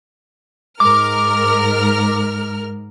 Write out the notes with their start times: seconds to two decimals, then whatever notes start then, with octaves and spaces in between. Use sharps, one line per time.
0.80 G#2 A#4 D6 F6